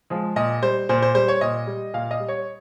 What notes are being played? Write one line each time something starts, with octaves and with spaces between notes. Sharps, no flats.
F3 G#3
A#2 D#5
G3 C5
A#2 C5
C5
G3 C5
C#5
A#2 D#5
G3
A#2 F5
D#5
G3
C#5